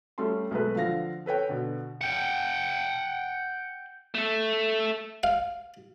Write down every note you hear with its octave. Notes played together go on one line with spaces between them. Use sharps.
G3 A3 C#4 A4 C6
B1 G#3 A3 A4 B4
D3 F3 F5 A#6
A4 B4 C#5 G5
B2 D3
F#5 G5
A3 A4
F5